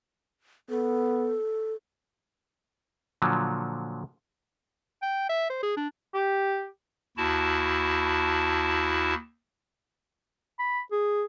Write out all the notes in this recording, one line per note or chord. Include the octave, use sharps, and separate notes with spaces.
B3 A4
A#2 D3 F3 F#3
G5
E5
C5
G#4
D4
G4
D#2 E4 F#4 A5
B5
G#4